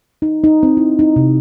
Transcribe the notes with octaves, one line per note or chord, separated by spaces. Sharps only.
D#4
D#4
C4
E4
D#4
C3